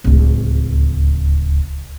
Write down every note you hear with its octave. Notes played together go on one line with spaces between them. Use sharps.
D1 C#2